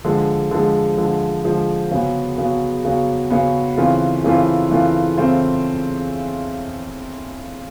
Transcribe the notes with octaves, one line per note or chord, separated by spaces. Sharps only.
D3 F3 G#3
D3 F3 G#3
D3 F3 G#3
D3 F3 G#3
C#3 F#3 B3
C#3 F#3 B3
C#3 F#3 B3
C#3 F#3 B3
C#3 E3 A3 C4 F4
C#3 E3 A3 C4 F4
C#3 E3 A3 C4 F4
C#3 E3 A3 C4 F4